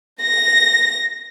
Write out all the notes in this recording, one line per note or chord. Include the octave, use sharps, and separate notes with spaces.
A#6